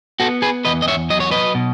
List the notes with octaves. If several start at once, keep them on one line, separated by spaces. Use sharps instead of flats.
B3 F#4 A4
G#4 B4
E2 B4 D#5
D#5
C#5 E5
F#3 D#5
C#5
B4 D#5
B2